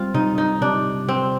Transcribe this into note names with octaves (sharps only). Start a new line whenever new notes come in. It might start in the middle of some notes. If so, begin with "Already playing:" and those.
Already playing: G3 C4 F4
C3 D#4
D#4
C3 D4
C3 C4